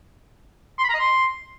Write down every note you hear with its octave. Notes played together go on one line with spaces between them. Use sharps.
C6
B5
A#5
D#5
C6